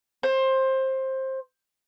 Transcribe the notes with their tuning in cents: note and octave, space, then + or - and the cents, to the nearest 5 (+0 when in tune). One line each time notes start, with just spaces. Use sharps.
C5 +15